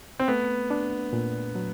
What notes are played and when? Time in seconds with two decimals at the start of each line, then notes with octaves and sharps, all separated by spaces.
0.19 C4
0.28 A3 B3
0.71 D4
1.13 A#2
1.55 F#3